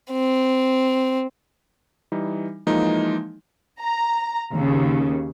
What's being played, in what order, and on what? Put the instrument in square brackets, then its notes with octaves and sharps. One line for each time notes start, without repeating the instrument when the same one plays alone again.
[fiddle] C4
[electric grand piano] E3 G3 D#4
E3 F3 G#3 A#3 D#4
[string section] A#5
D#2 C#3